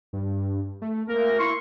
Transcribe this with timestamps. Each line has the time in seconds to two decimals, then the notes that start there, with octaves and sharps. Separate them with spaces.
0.13 G2
0.82 A3
1.08 D2 A#3 A#4
1.39 E4 C6 C#6